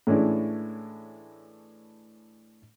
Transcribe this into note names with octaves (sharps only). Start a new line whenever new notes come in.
A2 E3 G#3 C#4 D4